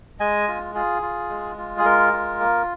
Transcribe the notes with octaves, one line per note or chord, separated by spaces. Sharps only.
G#3 D#5 G#5
F4
F4 G#4
F4
G#3
F4
G#4
G#3 A#4
F4
A#3